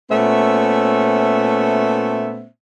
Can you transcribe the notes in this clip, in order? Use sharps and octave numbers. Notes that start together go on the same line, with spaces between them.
A#2 A3 B3 C#4 C5 E5